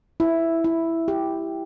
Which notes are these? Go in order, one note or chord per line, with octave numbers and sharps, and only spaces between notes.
E4
E4
G4